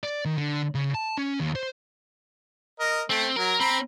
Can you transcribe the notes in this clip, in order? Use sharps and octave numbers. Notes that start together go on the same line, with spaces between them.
D5
D#3
D3
C#3
A5
C#4
D#2
C5
A#4 D#5
A3 C4
F#3 A#4
C4 A#5 B5